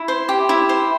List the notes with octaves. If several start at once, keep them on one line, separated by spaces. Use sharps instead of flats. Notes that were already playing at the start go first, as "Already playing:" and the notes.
Already playing: E4
C5
G4
E4
C5